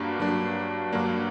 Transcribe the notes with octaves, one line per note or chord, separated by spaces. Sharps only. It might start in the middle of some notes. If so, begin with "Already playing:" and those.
Already playing: G2 F#3 A#3 D4
G2 F#3 A#3 D4
G2 F#3 A#3 D4